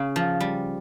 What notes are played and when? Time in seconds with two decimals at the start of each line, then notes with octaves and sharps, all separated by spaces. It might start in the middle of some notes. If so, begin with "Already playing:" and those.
Already playing: C#3
0.16 F3
0.40 G3